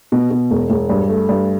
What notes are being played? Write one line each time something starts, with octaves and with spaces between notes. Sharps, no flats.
B2
B2
E1
E1
G2
A3
G2